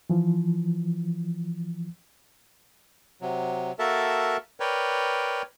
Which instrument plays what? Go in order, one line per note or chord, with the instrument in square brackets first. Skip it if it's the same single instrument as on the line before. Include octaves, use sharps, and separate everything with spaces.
[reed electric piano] E3 F3
[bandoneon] C3 F#3
A#3 F#4 A4 A#4 E5 A5
A#4 B4 C#5 D5 G5